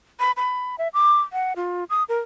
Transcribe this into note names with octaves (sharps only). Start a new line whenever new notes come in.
B5
B5
E5
D6
F#5
F4
D#6
A#4